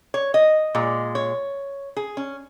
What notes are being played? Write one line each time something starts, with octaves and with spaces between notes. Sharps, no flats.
C#5
D#5
A#2 G#3
C#5
G#4
C#4